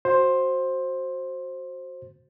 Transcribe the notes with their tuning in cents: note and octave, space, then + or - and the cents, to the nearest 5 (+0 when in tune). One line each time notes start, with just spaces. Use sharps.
F#4 +0 C5 +10